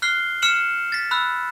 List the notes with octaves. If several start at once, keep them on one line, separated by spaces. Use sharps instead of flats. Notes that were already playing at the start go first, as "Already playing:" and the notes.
F6 F#6 C7 G7
F6 C#7 E7 F#7
A6 B6
B5 E6 F#6